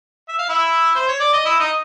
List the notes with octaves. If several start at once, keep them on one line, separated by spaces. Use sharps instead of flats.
E5
F5
E4 E5
C5
C#5
D5
D#5
E4 E5
D#4 D#5